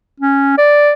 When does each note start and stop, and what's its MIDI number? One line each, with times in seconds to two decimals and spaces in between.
0.20 0.55 61
0.58 0.93 74